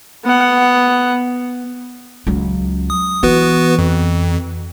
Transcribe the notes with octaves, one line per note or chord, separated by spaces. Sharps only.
B3 F#5
C#2 F#3
D#6
E3 B3 F#4 B4
F2